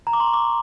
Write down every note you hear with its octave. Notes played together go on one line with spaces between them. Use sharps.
A#5
D6
C6
C#6
D6